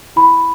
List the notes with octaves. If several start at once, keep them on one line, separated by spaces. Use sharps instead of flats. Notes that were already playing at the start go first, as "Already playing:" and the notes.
E4 B5